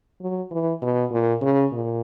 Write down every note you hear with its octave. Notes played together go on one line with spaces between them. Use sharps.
F#3
E3
B2
A#2
C#3
A#2